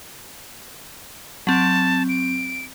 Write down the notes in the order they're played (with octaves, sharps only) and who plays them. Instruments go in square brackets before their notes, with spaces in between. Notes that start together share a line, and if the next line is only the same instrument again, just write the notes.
[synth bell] F#3 C4 [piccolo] A5
[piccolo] D7